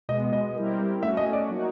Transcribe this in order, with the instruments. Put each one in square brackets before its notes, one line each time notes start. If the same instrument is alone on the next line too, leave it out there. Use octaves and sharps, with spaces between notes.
[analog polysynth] B2 G#3 B3 [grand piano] D#5
[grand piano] D#5
[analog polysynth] G3 C4 E4 G4 A#4
[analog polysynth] A3 C#4 F#4 [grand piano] E5
[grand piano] D#5
D5
[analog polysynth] F#3 A#3 D#4 F#4